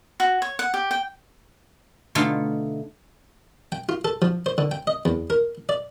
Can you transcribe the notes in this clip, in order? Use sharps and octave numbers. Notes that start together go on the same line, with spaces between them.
F#4
C#5
F#5
G4
G5
B2 D3 A3 D#4 F4
G5
F4
A4
F3
C5
D3
G5
D#5
E2
A#4
D5